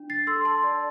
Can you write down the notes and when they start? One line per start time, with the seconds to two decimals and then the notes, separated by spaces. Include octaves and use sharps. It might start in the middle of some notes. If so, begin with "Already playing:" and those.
Already playing: D4
0.10 A6 C7
0.27 A4 C6 E6
0.45 A5 C6
0.64 D5